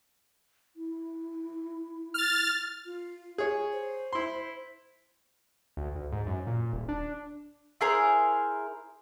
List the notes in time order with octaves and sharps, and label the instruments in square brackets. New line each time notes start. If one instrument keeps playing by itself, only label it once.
[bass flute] E4
[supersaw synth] F6 A6
[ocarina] F4
[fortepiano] G#4 C#5
[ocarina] C5
[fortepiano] E4 C6
[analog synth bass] D2
D2
G#2
F#2
A#2
D#1
D4
[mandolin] E4 G#4 A#4 C5